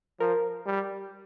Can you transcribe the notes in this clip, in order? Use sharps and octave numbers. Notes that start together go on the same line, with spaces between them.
F3 A#4
G3